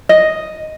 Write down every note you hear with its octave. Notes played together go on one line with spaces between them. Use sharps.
D#5